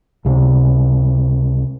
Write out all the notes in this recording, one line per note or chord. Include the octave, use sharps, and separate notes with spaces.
C#2 C3